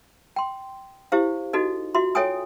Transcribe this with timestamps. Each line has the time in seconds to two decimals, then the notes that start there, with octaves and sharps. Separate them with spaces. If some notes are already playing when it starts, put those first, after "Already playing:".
0.36 G5 C6
1.12 E4 G4 C5 F5
1.53 D#4 F#4 A4 D#5
1.95 F4 F#4 E5 C6
2.15 A4 C#5 E5 G5 G#5 D#6